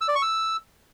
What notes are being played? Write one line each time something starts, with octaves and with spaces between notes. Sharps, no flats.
E6
D5
C#6
E6